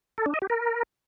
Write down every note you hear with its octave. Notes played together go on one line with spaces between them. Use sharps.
A4
D4
D#5
G4
A#4